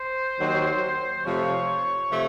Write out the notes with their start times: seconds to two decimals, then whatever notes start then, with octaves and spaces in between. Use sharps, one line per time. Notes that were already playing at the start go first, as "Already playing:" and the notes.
Already playing: C5
0.38 D#2 D#3 F#3
1.24 F2 C3 F3 A3 C#5
2.11 C3 F3 A3